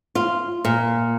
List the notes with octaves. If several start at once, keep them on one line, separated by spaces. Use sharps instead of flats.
F4
A#2